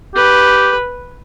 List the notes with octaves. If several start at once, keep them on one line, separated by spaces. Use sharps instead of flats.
G4 B4